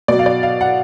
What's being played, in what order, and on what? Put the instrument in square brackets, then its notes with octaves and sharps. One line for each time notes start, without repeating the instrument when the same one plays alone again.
[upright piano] B2 F#3 D5
F5
D5
F5
F#5